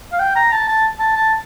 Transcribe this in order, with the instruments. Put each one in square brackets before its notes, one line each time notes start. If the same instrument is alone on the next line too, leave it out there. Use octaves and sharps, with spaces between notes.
[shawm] F5
G5
A#5
A5
A5
A5
A5